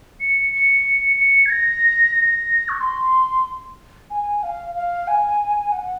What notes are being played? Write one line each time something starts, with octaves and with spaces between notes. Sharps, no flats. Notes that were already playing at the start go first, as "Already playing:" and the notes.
C#7
C#7
C#7
G#6
A#6
A#6
C#6
C6
G#5
F5
F5
G#5
F#5